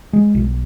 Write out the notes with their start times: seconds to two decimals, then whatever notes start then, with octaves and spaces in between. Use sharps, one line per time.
0.13 G#3
0.35 B1